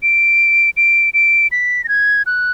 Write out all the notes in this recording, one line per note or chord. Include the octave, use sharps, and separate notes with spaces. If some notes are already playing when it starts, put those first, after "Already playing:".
D7
D7
D7
B6
A#6
G#6
F#6